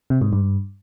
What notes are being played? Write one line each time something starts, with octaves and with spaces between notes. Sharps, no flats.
C3
G#2
G2